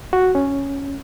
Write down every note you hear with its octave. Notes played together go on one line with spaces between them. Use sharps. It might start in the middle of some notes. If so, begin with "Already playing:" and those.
F#4
C#4